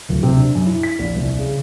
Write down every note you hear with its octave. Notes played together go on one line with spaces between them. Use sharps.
D1
C3
D4
F#2
E4
B6
A#1
C2
C#3